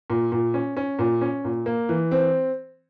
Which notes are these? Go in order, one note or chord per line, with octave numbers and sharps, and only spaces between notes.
A#2
A#2
C#4
C#4
A#2
C#4
A#2
A#3
E3
C4